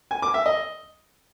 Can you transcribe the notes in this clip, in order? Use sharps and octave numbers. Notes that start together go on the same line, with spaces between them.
G#5
D6
E5
D#5